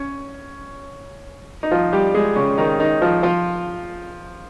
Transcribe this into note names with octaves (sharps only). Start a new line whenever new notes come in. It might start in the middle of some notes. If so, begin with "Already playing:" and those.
Already playing: C#4 C#5
D#4
F3 F4
G3 G4
G#3 G#4
C#3 C#4
D#3 D#4
D#3 D#4
F3 F4
F3 F4